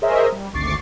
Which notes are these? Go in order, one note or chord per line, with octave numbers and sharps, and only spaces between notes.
G#4 A#4 C5 C#5 D#5 E5
G3
G#1 D2 C#6 D6 A6 C7